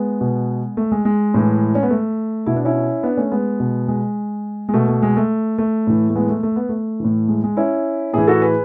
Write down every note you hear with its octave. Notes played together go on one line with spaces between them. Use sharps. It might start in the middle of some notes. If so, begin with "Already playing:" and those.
Already playing: G#3 B3
B2
A3
G#3
G#3
A2 E3
C#4
B3
A3
B2 E4
D4
C#4 E4
B3 D4
A3 C#4
G#3 B3
B2
G#3
G#3
B2 A3
A3
G#3
A3
A3
A2 E3
A3
G#3 B3
A3
A3
B3
A3
A2 E3
G#3
G#3
C#4 E4
A2 E3 E4 G#4
F#4 A4
G#4 B4